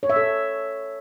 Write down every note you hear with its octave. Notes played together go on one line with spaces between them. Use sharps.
C#5
E5
A4